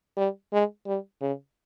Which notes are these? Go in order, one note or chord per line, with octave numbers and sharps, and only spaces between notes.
G3
G#3
G3
C#3